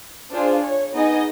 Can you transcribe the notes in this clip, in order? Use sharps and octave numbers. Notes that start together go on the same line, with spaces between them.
D4 F4 G#4 C5
C#5
B3 D#4 G#4 D#5